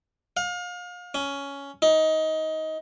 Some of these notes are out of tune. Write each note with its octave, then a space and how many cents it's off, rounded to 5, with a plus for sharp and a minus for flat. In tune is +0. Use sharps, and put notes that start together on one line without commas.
F5 +35
C#4 +10
D#4 +20